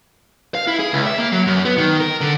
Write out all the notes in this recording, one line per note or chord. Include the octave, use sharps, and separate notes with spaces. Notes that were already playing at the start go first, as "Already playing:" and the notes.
F5
E4
G#4
C#2
E5
A#3
F#3
F#2
B3
D#3
A#4
D3